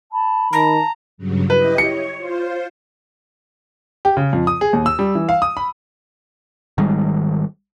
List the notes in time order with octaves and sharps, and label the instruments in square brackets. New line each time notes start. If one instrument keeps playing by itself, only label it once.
[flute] A5 [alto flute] B5
[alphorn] D#3 [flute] A5 [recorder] A#5
[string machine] G2 C#3 F#3
[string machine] E4 G4 D#5 [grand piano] B4
[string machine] C#5 [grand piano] C#7
[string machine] F4 C5
[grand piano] G4
C#3
F2
D#6
G#4
D#2
E6
G3
E3
F5
D#6
B5
[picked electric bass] G#1 D#3 G3 G#3